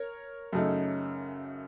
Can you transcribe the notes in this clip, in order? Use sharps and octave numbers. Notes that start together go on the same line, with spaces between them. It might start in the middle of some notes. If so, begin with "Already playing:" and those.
Already playing: A#4 C#5
F#2 C#3 A3 D#4